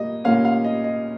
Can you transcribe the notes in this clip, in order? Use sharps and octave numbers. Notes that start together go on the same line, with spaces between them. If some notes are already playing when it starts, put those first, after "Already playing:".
Already playing: A#2 G3 A#3 D#5
A#2 G3 A#3 C#4 F5
F5
D#5
D#5